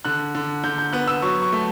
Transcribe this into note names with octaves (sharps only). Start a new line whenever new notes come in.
D3 F#6
D3
D3 G6
G6
B3 F#6
E6
F#3 C#6
C#6
A3